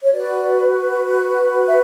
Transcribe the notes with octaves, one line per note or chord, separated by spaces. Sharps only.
C#5
F#4 B4 D5
E5